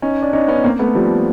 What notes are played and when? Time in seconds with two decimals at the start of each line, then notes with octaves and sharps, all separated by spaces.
0.02 C#4 D#4
0.22 D4
0.33 C#4 D#4
0.48 B3 C#4
0.64 A#3 C4
0.79 A3 B3
0.95 F3 G3